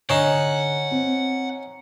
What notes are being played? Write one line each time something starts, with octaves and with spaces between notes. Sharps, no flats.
D3 C#4 D#4 F#5 C7 E7
C4